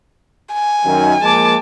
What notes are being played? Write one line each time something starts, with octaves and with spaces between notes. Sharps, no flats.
G#5
F#2 D#3
F3 G#3 A#3 A5 D6